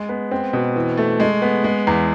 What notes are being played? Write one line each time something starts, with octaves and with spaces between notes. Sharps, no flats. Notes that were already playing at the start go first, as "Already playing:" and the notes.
Already playing: G#3
B3
C4
B2
E3
A3
G#3
B3
G#3
E2